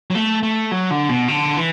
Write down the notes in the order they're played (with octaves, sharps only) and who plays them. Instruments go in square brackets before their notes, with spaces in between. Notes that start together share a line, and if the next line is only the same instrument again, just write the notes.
[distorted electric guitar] F#3
A3
A3
F#3
D3
B2
D3
E3